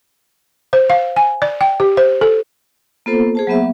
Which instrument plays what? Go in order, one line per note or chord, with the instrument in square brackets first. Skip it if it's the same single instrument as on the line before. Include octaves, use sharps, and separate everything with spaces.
[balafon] C5
F5
G#5
D5
G5
G4
C5
A4
[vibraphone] A#3 B3 F4 A4 C5
G#4 C5 A5
F#3 A#3 B3 E5